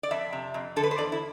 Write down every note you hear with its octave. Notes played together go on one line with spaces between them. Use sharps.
D5
F2 E5
C3
F2
D3 A4
B4
C5
E2 D5
E4